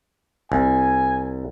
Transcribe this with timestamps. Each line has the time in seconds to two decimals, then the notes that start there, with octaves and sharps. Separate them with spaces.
0.52 C2 G#5